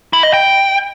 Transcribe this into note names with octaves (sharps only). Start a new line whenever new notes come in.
E4
D#5
G5